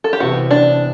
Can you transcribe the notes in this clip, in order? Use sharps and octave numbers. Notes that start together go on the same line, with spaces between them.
A4
G4
C3 E3 B3 F#4
D4